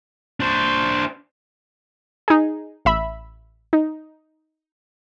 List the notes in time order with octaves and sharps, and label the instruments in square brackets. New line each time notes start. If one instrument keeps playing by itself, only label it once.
[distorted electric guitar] D4 C5
[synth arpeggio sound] D#4 G#4
A1 E5 B5
D#4